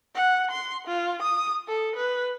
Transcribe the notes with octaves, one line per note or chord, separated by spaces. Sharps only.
F#5
C6
F4
D#6
A4
B4